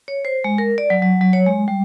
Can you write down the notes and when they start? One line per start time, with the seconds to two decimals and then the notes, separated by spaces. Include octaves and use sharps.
0.08 C#5
0.25 C5
0.44 G#3
0.58 A#4
0.78 D5
0.90 F#3
1.02 F#3
1.21 F#3
1.33 C#5
1.46 G#3
1.68 G3